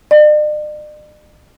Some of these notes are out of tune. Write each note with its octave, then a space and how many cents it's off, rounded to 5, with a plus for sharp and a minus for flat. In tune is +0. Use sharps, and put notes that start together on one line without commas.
D5 +45